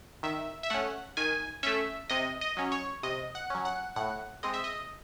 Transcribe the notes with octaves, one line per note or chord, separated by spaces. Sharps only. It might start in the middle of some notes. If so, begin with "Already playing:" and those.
D#3 E5
E5
A3 C#4 F#5
D#3 G#5
A3 C#4 E5
C3 D#5
D#5
F#3 C#4
C#5
C3 D#5
F#5
F#3 C#4
F#5
A2 F#5
G#3 C4 D#5
E5
D#5